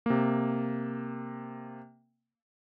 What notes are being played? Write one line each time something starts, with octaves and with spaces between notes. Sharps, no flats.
C3 A#3